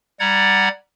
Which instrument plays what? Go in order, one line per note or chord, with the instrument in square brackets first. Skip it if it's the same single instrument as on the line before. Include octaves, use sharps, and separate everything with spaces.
[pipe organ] G3 D5 F#5 A#5 G#6